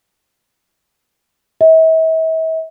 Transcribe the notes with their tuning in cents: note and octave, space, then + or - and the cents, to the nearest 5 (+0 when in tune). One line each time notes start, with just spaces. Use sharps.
E5 -40